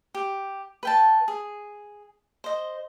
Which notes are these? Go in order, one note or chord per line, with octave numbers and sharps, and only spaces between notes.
G4
B4 G5 A5
G#4
C5 D#5